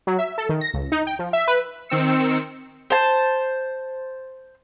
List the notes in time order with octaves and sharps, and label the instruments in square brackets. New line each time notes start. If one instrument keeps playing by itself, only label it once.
[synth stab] F#3
E5
A4
D#3
A#6
C#2
D#4
G5
F3
E5
B4
[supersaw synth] D#3 C4 E6 C#7
[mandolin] C5 A5